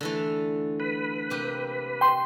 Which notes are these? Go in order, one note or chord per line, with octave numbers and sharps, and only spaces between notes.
D3 E3 A3
B4
C3 A#3 G4
G5 C6